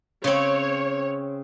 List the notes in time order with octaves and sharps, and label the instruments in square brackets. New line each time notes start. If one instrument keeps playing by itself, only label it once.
[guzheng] C#3 C4 [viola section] C#5